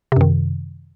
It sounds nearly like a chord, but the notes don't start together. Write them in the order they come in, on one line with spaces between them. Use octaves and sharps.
C3 F#2 D#3